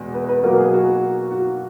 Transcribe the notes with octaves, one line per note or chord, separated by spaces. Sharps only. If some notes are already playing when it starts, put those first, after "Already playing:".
Already playing: E2 B2 G#3
B4
B4
B2 F#3 A#3 A#4
G#4
F#4
F#4